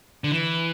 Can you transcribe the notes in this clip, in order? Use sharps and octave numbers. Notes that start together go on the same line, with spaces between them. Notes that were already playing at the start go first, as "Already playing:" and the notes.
D3
E3